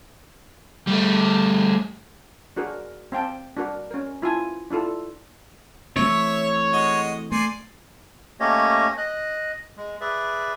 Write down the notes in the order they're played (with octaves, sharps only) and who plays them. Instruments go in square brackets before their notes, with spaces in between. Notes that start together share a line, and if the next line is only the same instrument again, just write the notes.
[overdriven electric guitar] G3 A3
[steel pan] D4 F#4 G#4 A#4
C4 F5 G5 A5
D4 F#4 A#4
C#4 A#4
E4 F4 F5 G#5 A5
D4 E4 F4 A4
[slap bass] E3 A3 C4 [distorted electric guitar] C#5 [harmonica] E5
[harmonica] G#3 F#4 D#5
[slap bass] A3 [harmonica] D5 G#5 C6
[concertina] A3 A#3 C#4 G4 C#5 D#5
D#5 F#6
G#3
G#4 B4 D5 E5